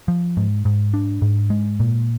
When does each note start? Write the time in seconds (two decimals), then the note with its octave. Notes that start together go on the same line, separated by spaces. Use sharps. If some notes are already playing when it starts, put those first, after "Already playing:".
0.08 F3
0.37 G#2
0.65 G#2
0.94 D4
1.22 G#2
1.50 G#3
1.80 A#2